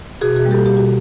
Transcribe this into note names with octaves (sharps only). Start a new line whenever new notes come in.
B2 F#4 G#4
F#4 G#4
G3 A#3
G4 A4
B2 G4
F#4